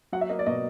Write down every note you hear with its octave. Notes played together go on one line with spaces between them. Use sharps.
F#3 F#5
E5
A#3 D#5
D5
B2 D#5